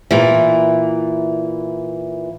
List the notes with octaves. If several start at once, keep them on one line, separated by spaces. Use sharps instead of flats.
A#2 E3